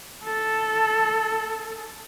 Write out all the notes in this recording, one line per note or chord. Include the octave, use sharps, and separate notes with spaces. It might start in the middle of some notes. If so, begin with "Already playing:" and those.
A4